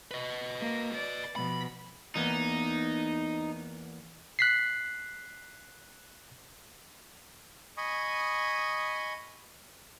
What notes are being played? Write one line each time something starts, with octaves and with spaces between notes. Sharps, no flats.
B4 D#5
A#3
D5
B2 F3 B5
E2 A#3 B3 D#4
F#6 B6 C7
D#5 G#5 B5 C#6 D#6